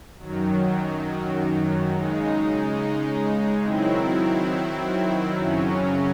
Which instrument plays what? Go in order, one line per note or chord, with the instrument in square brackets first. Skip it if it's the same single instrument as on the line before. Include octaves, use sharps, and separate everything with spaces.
[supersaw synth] F#2 D#3 F#3
C#3 G#3 D#4
D#3 F#3 C4 E4
F#2 C#3 F#3 C#4